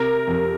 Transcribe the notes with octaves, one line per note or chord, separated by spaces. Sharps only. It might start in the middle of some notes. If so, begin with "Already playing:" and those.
Already playing: C3 A#4
F2